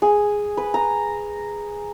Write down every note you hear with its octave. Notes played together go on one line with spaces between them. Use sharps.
G#4
B4
A#5